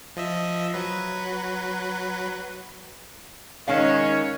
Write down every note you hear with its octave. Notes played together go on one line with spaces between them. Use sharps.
F3 D#5 E5
F#3 B4
D#3 G#3 C#4 C#5 F5